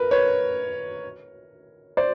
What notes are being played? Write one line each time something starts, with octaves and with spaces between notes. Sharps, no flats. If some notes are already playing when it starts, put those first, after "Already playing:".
Already playing: A#4 B4
B4 C#5
C5 D5